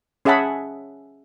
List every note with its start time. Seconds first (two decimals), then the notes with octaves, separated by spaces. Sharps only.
0.25 C#4 G#4 E5 F#5 A5 B5